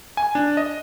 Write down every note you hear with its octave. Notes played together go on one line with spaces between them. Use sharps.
G#5
D4
D#5